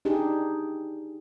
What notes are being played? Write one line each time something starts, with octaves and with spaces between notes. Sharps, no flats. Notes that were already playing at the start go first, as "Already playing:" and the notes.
D4 D#4 G4 G#4